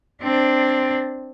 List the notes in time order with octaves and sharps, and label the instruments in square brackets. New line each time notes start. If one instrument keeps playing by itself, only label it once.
[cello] C4 D4